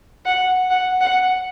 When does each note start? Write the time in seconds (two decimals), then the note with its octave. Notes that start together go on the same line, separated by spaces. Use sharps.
0.25 F#5
0.70 F#5
1.01 F#5